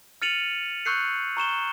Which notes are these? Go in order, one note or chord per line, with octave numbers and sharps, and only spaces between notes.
F6 A6 C#7 D#7 F7 F#7
C#6 E6 F#6 G6 C7 C#7
A#5 C#6 E7 G7